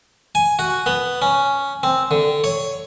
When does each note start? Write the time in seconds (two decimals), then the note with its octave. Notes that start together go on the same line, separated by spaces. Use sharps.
0.35 G#5
0.59 F#4
0.86 B3
1.22 C#4
1.83 C4
2.11 D3
2.44 C#5